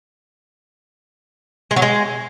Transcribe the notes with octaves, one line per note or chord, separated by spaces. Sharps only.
G#3
F#3
G#3